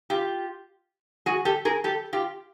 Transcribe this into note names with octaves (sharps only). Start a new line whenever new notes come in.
F4 G4
F#4 G#4
G4 A4
G#4 A#4
G4 A4
F4 G4